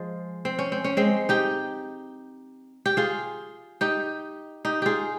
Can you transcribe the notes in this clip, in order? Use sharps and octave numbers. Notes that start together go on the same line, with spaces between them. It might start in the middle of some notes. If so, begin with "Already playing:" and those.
Already playing: F3 G#3
C4
C#4
C4
C#4
G#3 C4
D#4 G4
G4
F4 G#4
D#4 G4
D#4 G4
F4 G4 G#4